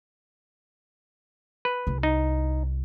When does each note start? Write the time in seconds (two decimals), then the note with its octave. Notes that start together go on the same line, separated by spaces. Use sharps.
1.65 B4
1.87 C2
2.03 D#4